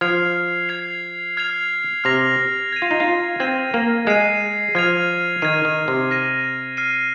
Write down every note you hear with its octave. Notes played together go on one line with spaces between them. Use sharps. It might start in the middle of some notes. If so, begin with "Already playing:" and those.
F3 F6 G#6 C7 F7
G#6 C7 F7
F6 G#6 C7 F7
C3 F6 A#6 F7
G#6 D#7
F4
D#4
F4
C4 G#6 D#7
A#3
G#3 G#6 C7 D#7
F3 F6 G#6 F7
D#3 F6 G#6 D#7
D#3
C3
F6 A#6 D#7
F6 C7 D#7